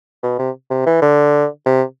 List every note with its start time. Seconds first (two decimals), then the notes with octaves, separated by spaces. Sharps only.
0.23 B2
0.39 C3
0.70 C3
0.86 E3
1.02 D3
1.66 C3